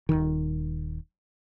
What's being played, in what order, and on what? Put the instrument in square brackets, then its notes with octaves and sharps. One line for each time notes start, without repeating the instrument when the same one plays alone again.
[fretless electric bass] D#1 C2 D#3